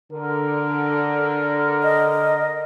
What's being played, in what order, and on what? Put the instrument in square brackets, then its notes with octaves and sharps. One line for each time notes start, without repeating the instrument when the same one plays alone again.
[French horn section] D3 [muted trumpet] A#4
[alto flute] D#5